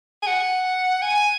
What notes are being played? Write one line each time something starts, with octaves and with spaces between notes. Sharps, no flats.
G#5
F#5
G#5